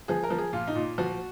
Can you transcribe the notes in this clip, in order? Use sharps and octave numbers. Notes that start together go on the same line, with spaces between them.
F3 G#4
A#4
F3
G#4
A#2 F4
D#4
A#2
F3 F#4